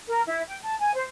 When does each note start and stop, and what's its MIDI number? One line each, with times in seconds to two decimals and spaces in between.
0.08 0.20 70
0.27 0.42 64
0.47 0.56 79
0.62 0.77 81
0.78 0.90 80
0.94 1.04 72